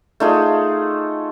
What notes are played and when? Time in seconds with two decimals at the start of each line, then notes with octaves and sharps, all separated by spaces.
0.20 A3 D#4 F4 G#4